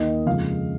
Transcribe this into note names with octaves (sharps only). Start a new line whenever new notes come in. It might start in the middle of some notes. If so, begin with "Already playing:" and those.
Already playing: D#2 D#3 A#3 D#5
F2 C#3 G#3 F5